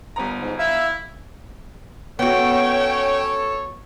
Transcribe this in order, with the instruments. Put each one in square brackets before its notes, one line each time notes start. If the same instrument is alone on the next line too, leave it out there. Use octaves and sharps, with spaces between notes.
[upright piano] G1 B3 A#5
[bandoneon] G#2
[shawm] E4 [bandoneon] E5 F5 E6
[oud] B3 F#4 [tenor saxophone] C#4 [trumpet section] A4 C#5 [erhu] G5